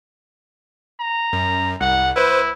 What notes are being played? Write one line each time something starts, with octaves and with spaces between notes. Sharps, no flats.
A#5
F#2
C2 F#5
E4 B4 C5